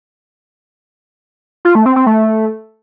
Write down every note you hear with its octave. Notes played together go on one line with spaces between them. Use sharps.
F4
A3
C4
C4
A3